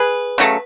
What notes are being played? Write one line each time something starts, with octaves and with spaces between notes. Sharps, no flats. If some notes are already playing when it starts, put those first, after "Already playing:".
Already playing: G#4 B4
C#3 F#3 A3